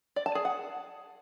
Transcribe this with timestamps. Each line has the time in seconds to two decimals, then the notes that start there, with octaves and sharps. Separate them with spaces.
0.16 D5
0.26 A5
0.35 G#4
0.45 F#5